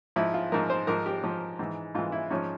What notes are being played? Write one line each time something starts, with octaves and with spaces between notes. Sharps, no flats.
G#2 F3 E4
F4
G#2 F3 A#4
C5
G#2 F3 A#4
G4
G#2 F3
G#2 E3
G#2 E3 F4
E4
G#2 F3 C#4